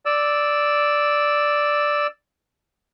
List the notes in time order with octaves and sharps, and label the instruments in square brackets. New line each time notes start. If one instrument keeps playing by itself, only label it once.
[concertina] D5 E6